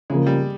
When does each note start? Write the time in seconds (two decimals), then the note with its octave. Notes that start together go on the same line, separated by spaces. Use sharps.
0.10 C#3 F3 G#3 A#3
0.26 G3